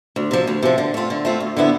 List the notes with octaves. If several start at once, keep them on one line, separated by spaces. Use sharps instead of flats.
D2
C3 F3
D2
C3 F3
D3
A3 C4 F4
D3
A3 C4 F4
D2
D3 F3 B3 E4